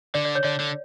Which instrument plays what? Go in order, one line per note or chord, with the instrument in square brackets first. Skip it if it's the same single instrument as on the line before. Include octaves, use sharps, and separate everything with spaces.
[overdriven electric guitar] D3 [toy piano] D5
[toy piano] D5
C#5
[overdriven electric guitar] D3 [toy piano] D5
[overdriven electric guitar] D3